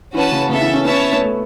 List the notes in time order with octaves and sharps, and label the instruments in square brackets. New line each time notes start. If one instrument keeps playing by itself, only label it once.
[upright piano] E3 [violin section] C#4 F#4 B4 A5
[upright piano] C#3
[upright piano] C#3 [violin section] B3 A4 E5
[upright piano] E3
C#4
[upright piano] B3 [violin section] C#4 E4 C#5 E5 A5
[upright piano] B3
A3